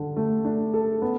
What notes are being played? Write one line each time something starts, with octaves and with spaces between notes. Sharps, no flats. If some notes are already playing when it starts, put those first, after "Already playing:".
Already playing: D3 A4
A3
D4
A4
B3